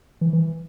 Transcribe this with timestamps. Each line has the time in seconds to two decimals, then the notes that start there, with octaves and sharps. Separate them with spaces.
0.21 E3
0.33 E3